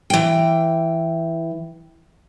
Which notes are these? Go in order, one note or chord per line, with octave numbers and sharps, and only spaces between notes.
E3 G5